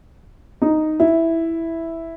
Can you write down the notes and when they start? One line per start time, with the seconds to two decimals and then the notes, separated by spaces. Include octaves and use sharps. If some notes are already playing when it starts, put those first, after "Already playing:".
0.62 D#4
1.00 E4